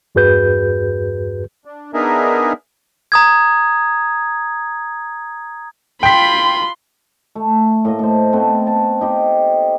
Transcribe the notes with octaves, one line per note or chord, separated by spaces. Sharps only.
E2 G2 F#4 G#4 B4 G6
D4
B3 D4 D#4 G#4 A#4 E5
A#5 D#6 G#6
F4 G5 B5 C6 B6
A3
A2 A#3 D#5
A4 C5
A3 B3 C4 A4
A5
D#4 G4 C6